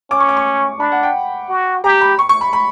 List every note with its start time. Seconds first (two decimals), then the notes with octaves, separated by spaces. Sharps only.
0.11 C#4 D6
0.20 C#6
0.29 D6
0.37 C#6
0.80 D4 B5
0.92 F#5
1.03 G5
1.49 F#4
1.84 G4 A#5
2.01 B5
2.19 C#6
2.29 C#6
2.41 B5
2.53 B5